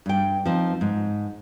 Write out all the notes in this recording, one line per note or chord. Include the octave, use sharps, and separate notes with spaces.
G2 G5
F3 C4 D#4
G#2